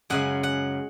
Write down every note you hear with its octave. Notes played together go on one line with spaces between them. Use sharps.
F#2 C#3 G#3 F#5
F#5